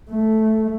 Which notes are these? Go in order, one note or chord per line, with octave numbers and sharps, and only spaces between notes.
A3